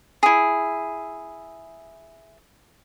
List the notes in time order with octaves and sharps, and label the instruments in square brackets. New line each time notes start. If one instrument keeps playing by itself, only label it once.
[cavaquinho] E4 G#4